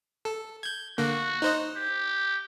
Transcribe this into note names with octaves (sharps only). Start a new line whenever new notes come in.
A4
G6 G#6
D3 A#3 F#4
D#4 C5 D#5
G4